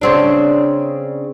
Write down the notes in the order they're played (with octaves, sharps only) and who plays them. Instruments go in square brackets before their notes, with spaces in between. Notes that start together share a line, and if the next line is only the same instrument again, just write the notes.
[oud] C#3 C4 D4